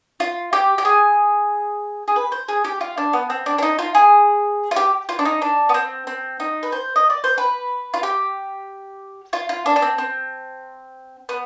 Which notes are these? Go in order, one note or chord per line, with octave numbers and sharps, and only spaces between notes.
F4
G4
G4
G#4
G#4
B4
C5
G#4
G4
F4
D4
B3
C4
D4
D4
D#4
F4
G#4
F4
G4
F4
D4
D#4
D4
B3
C4
C4
D#4
B4
C5
D#5
D5
C5
B4
F4
G4
F4
F4
D4
D4
C4
C4
B3